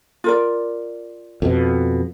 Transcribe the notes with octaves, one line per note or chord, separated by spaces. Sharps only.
F4 A#4 D5
F2 B2